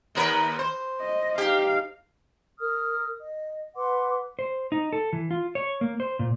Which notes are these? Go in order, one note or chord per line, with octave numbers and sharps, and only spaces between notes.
D#2 A#4 B4
C5
D#5
D#4 G4 F5
A#4 D#6 F6
D#5
B4 F#5 C6 D6
C5
D#4
A4
E3
F4
C#5
A#3
C5
A#2